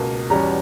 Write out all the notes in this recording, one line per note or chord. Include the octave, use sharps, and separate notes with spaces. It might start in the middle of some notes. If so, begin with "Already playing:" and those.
Already playing: C#2 B2 A#3
E2 B2 G3 C#4 A#5